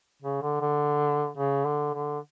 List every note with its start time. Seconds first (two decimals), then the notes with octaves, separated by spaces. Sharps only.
0.22 C#3
0.42 D3
0.61 D3
1.37 C#3
1.66 D3
1.94 D3